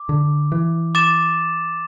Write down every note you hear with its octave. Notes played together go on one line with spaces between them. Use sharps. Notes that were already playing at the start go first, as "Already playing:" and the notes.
Already playing: D6
D3
E3
D6 A6 E7